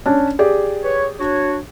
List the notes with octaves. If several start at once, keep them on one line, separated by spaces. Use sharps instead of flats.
C#4 D4
G4 G#4 D5
B4 C#5
D4 F#4 C#5